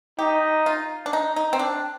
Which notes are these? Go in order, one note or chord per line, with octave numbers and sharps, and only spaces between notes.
D#4 G4
F4
D4
D#4
D#4
C4
D4